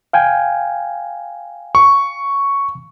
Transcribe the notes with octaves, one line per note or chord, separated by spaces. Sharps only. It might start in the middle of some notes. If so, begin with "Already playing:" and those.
F5 G5 G#5
C#6